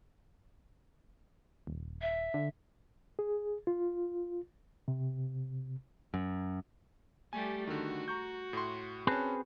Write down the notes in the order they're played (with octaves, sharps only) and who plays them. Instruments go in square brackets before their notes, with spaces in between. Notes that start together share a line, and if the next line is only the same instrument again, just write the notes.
[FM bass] D#1
[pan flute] E5
[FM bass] D3
[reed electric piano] G#4
F4
C3
[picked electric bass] F#2
[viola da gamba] G3 A3 G4 [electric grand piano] G#5
[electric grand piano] D3 D#3 [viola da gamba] F#4
[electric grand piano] A#5 C#6 G6
A2 C6
[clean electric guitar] C4 G#4 B4 [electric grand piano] C#4 A5